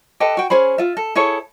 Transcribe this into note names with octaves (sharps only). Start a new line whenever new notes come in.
G4 A4 B4 D#5
F#4 G5
C#4 G#4 C5 B5
F4 E5
A4
E4 G#4 A4 C#5